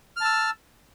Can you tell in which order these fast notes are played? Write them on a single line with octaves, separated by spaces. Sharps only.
F6 A5 E6